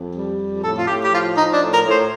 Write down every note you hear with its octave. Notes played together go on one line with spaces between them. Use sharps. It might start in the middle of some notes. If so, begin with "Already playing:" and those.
Already playing: F2
G3
F2
A2 A4
F4
A2 G4
G4
F3 F4
F3 D#4
D4
A2
A#4
A2
C5